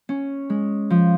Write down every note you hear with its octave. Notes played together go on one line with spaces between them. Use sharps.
C#4
G#3
F3